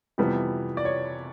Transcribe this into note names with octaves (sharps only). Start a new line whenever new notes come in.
F2 C3 E3 G3 B3
D5
C#5